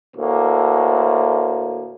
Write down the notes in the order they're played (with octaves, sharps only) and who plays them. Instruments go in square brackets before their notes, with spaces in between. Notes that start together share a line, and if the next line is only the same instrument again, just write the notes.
[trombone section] D2 A2 A#3